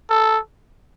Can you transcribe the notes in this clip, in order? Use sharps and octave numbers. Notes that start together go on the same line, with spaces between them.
A4